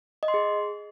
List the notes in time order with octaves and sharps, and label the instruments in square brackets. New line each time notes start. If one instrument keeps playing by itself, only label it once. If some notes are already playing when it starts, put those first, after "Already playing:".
[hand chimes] D#5
C6
G#4